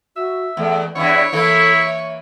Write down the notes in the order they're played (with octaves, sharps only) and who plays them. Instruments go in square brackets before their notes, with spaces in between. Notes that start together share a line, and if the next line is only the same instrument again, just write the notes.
[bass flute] F#4 [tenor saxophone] E5
[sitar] E2 [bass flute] A3
[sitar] E2 G2 E3 [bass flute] D4 [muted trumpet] E4 [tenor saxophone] C#5
[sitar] E3 A#3 [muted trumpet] E4 [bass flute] A4
[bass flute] E5